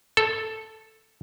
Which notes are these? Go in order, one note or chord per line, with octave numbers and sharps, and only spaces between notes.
A4